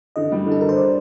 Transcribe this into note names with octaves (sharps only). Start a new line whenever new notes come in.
D3 D#5
G3
D3
A4
D3 A#4
C5
D5